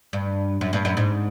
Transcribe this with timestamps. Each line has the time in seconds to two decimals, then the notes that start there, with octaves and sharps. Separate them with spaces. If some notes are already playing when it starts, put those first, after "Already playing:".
0.13 G2
0.61 F#2
0.73 G2
0.85 F#2
0.97 G#2